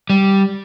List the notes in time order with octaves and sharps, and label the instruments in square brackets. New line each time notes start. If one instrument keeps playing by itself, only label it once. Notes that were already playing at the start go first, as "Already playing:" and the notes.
[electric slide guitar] G3